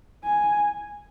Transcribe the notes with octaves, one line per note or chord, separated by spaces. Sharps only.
G#5